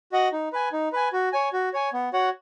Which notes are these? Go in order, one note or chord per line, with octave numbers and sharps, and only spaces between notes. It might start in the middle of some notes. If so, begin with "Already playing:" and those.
F#4 D#5 F#5
D#4
B4 G#5
D#4
B4 G#5
F#4
C#5 G#5
F#4
C#5 G#5
B3
F#4 C#5 F#5